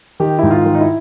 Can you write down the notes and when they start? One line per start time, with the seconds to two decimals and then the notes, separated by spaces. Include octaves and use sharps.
0.20 D#3 G4
0.39 G#2 E4
0.51 F4
0.66 D#3
0.75 D#4
0.81 E4